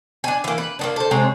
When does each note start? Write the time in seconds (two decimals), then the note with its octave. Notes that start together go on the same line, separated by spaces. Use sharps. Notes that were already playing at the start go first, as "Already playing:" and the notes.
0.24 D4 G#5
0.44 E3 A#3
0.58 B4
0.79 A#3 B3 D4
0.96 A4 C5
1.11 C3 G#3 C4 C#5